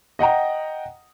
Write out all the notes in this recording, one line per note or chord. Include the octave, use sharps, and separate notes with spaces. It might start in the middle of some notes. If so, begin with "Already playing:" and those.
D#5 F#5 G5 A#5